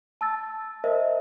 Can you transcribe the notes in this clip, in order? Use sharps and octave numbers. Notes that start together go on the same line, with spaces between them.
A5 E6 A6
A#4 C5 D#5 E5